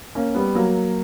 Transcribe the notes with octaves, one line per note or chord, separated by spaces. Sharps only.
A#3 C#4
G3 B3
F#3 A#3